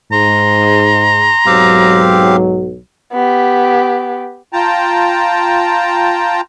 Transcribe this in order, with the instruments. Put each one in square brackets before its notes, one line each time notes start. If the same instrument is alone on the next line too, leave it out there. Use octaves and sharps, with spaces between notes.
[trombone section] G#2 [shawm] A#5 [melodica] C6
[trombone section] B1 G#2 F#3 [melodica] C4 G4 F5
[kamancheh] B3 G4
[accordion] F4 G5 A5 A#5